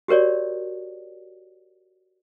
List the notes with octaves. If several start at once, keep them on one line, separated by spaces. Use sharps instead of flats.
F#4 G4 A#4 C#5 D5